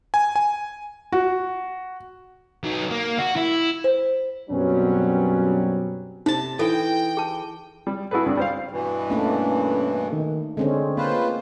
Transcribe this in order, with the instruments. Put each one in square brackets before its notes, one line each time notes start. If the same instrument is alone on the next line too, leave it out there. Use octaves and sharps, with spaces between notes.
[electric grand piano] G#5
G#5
[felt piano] F#4
[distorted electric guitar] F#3 D#4
A#3
F#4
E4
[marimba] C5
[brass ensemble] F#2 B2 F#3 G3 C4 C#4
[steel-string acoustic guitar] C3 A5 [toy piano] D#4
[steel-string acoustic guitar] E3 [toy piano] A4 [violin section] G5
[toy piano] G#4 A5
[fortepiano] G3
E4 F#4 G#4 A4 B4
G2 D4
G3 C5 F5
[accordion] G2 B2 E3
[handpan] A3 A#3 D4 [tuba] C#4
[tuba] D#3
[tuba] D3 [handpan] G#3 C4 C#4
[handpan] A#3 [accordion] F4 B4 C5